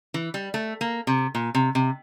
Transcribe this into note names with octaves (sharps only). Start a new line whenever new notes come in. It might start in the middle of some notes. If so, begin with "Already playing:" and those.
E3
G3
A3
A#3
C3
A#2
C3
C3